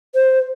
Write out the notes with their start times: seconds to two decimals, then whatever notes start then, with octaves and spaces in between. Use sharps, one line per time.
0.15 C5